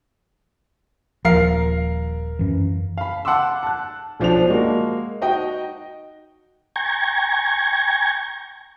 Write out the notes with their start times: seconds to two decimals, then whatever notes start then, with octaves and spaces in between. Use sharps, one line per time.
1.25 D#1 F3 A#4 F5 C7
2.39 F#2 E3
2.98 F5 B5
3.25 F#5 A5 C6 D6 E6
3.63 A5 F#6
4.20 B1 F3 D4 C5 F7
4.49 G#3 A#3 F#4
5.22 D#4 F#4 D#5 G5
6.76 G5 G#5 A#5 C#6 G#6